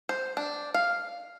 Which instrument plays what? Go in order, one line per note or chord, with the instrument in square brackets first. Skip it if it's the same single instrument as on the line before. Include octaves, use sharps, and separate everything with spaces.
[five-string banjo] C5
D4
F5